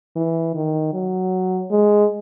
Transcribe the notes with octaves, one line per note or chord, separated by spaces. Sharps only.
E3
D#3
F#3
G#3